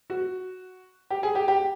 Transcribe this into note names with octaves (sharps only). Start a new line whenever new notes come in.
F#4
G4
G#4
G4
G4